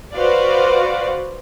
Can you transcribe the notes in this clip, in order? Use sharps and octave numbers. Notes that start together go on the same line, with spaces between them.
F#4 B4 C5 D5 F5